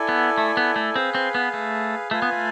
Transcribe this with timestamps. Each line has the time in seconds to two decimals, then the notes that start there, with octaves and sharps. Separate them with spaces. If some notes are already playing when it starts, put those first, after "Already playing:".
Already playing: E4 A4 D5 G#5
0.09 B3
0.38 A3
0.57 B3
0.76 A3
0.95 C4 G#4 B4 F5
1.15 C4
1.35 B3
1.54 A3
2.11 A3 F4 B4 F5 G#5
2.22 B3
2.32 A3